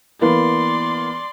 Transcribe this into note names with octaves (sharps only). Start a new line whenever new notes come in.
E3 A#3 B3 D5 C6